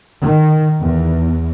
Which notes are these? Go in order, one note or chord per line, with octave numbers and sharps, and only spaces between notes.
D#3
E2